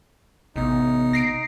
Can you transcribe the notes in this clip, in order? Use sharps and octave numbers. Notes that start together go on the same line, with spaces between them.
A1 C3 B3 D#4
A#6 C7 D7